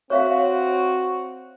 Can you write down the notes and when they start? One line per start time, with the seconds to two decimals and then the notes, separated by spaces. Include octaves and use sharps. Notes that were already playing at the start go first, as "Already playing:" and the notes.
0.10 C4 F#4 C#5 E5 F5